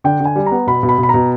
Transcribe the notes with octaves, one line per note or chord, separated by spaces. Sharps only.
D3 G5
D3
G#5
G3
A#5
B3
B2 B5
B2
B5
B2
B5
B2 A#5